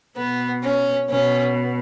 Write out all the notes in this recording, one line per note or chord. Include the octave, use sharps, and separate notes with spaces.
B2 B3
C#4
B2 C#4